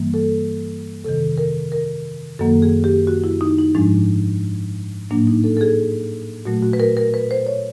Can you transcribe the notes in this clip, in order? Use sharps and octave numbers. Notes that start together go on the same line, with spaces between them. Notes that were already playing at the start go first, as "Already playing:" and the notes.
Already playing: G2 E3 G3 A#3
A4
F2 C3 D#3 A4
A#4
A#4
F#2 D#3 F#3 A#3 A4
G#4
G4
F#4
E4
D#4
D#4
G#2 F3 G#3 D4
A2 F#3 A#3 D4
D#4
A4
A4
G#4
A#2 F#3 A3 F#4
F#4
B4
A#4
A#4
B4
C5
C#5